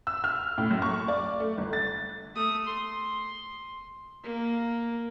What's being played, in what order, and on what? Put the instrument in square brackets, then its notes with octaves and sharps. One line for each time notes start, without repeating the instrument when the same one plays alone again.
[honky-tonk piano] E6
F6
A2
F#2
C#6
D5
A3
G1
A6
[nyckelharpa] A3 D#6
C6
A#3